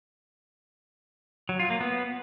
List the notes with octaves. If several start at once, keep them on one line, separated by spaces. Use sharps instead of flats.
F#3
F4
A#3
B3